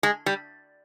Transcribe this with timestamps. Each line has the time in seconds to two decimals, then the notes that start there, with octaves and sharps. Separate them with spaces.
0.03 G#3
0.26 G3